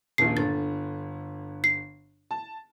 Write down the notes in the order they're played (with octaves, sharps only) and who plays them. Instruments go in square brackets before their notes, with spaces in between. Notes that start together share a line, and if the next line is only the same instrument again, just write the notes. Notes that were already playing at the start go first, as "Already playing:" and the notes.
[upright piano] D#1 A#1 [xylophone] C7
[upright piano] G1 D3 [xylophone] A6
[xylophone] C7
[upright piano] A5